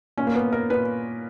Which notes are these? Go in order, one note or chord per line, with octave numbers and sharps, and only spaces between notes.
A#2 C#4
A#3
B3
A#4
A#2 B4